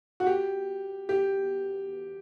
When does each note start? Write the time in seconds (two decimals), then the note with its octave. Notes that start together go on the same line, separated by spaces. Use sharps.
0.20 F#4
0.27 G4
1.09 G4